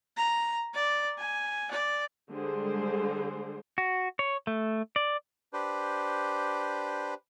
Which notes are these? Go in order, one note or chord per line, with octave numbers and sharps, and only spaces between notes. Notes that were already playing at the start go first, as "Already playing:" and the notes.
A#5
D5
G#5
D5
D3 G3 G#3 G#4 C5
F#4
C#5
A3
D5
D4 G4 B4 C5